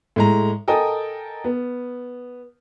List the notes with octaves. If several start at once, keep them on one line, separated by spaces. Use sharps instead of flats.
A2 G#3 A#5
A4 A#4 D#5 G5 G#5 D#6
B3